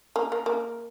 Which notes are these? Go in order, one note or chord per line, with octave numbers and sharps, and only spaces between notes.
A#3
A#3
A#3